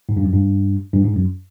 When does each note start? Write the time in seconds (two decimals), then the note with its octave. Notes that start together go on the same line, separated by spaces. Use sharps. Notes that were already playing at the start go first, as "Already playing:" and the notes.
0.09 G#2
0.17 G2
0.24 F#2
0.33 G2
0.93 G2
1.05 G#2
1.16 F#2